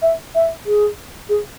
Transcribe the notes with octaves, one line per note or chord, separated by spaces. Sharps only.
E5
E5
G#4
G#4